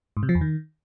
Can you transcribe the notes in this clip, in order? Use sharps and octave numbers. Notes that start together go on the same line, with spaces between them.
G#2
C3
F3
E2
D#3